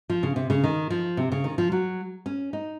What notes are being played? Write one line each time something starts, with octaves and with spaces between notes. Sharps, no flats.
F3
C#3
C3
C#3
D#3
F3
C3
C#3
D#3
F3
F#3
C#4
D#4